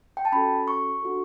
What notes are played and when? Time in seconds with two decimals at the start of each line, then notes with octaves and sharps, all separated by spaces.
0.17 G5
0.25 A5
0.32 C#4 F#4 A4 B5
0.68 C#6
1.03 D4 F#4 A4